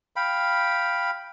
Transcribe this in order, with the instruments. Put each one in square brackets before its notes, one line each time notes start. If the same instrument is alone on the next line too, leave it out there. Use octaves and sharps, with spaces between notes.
[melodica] F5 G5 B5